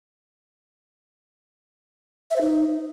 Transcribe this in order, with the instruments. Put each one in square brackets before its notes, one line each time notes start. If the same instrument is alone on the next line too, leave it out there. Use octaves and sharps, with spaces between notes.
[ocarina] E5
C5
D#4